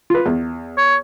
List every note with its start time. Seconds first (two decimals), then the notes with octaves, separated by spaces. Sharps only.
0.10 F4 B4
0.26 E2
0.78 C#5